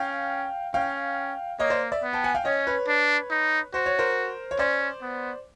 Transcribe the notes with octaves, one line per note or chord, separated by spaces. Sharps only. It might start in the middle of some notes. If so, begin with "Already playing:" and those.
Already playing: C#4 F5 G5
C#4 F5 G5
A#3 C#5 D#5
C5 D5
D5 E5
B3
G5 A5
F#5 G#5
F5 G5
C#4 C#5 D#5
B4 C#5
D4
D#4
F#4 C5
C#5
A#4 C5
C#5
C#4 C5 D5
B3